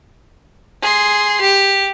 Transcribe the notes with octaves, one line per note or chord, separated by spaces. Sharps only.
G#4 C6
G4